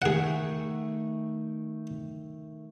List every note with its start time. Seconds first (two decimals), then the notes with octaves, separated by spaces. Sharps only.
0.02 D#3 A3 G#4 F#5